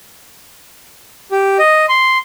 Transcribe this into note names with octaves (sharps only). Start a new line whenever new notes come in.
G4
D#5
C6